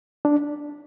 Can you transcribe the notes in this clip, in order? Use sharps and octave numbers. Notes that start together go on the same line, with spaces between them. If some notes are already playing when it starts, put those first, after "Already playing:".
D4